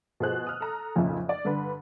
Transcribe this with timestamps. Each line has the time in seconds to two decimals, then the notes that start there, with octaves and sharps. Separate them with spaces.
0.20 B2 F3 G#4 C5 F#6
0.47 D#6 F6
0.61 A4 A#5
0.96 B1 F2 A#2 C#3 C#4 E5
1.29 D5
1.45 G2 D3 B4